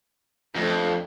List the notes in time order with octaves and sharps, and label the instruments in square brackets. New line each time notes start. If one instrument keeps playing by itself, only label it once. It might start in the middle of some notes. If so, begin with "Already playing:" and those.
[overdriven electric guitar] F2 [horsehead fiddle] A3 D4